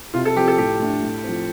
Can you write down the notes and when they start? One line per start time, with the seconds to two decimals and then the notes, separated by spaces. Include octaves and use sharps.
0.14 C3 F4
0.25 A4
0.36 F3 C4 G4
0.48 A4
0.58 A2 G4
0.80 A3 D4
1.03 A2
1.24 F3 C4